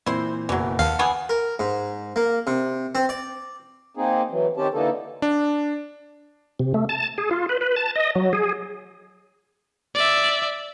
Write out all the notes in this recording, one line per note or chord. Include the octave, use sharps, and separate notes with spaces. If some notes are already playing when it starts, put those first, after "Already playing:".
A#2 E3 C4 E4 C5
F#1 B1 E3 F#3
D#2 F5 F#5 A5
E3 B3 G#4
A#4
G#2
A#3
C3
C4
D5
A#3 C4 D#4 G#4
E3 F#3
D#3 C4 C#4 G4 A5
D3 E3 A#3 D#4 A4
D4
C3
A3
A5
G#4
F4
B4
B4
A5
D#5
F#3
G#4
D5 E5